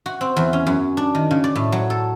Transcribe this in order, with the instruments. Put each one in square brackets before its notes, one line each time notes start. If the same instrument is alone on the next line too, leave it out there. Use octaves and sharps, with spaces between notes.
[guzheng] F#4
C4
E2
C#4
F#2
D4
D#3
C#3
D5
A2
F#3
A4